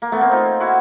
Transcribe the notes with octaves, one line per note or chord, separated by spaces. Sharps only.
A#3
A3 B3
A#3 C4
D#4 F4
E4 F#4